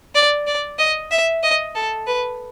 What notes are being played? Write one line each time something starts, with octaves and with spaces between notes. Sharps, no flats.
D5
D5
D#5
E5
D#5
A4
B4